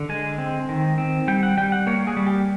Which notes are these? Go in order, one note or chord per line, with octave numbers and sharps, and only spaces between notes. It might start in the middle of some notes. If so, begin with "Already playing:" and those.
Already playing: D3
G#3 G#5
C4
D#3
C4
G3 G5
F#5
G3 G5
F#5
A#3 C#5
G#4
G3
G4